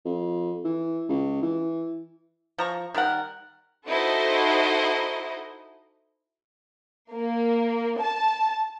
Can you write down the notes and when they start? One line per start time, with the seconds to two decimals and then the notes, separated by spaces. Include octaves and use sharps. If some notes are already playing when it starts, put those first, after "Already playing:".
0.05 F2
0.64 E3
1.09 C#2
1.42 E3
2.58 F3 A#5 C#6
2.94 D#3 G3 A#4 F#5
3.87 D#4 E4 F#4 A4 C5 D#5
7.13 A#3
8.00 A5